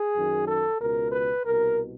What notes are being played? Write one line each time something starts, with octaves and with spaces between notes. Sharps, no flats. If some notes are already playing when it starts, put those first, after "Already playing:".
Already playing: G#4
F#2 D#3
A4
C#2 B2 A#4
B4
C2 B2 A#4